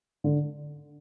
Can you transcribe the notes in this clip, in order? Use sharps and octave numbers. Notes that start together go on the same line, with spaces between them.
D3